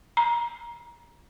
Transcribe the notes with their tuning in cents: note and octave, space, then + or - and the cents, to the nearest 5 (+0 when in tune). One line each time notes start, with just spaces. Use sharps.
A#5 +25